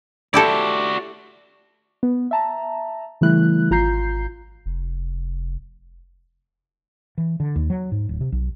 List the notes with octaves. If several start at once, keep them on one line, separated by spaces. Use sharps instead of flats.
E4 F#4 G4 A4 D5
B3
E5 A5 A#5
C#3 E3 G3 A3 E4 F#6
G#1 F4 A#5 G6 C7
F1
E3
D3
D#2
F#3
G#2
D1
C3
B1